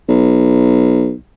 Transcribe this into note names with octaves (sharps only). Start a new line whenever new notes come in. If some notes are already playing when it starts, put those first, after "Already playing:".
B1